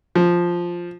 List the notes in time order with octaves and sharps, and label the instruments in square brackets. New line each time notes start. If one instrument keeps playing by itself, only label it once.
[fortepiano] F3